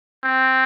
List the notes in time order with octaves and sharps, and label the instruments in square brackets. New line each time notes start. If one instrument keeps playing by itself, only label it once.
[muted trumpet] C4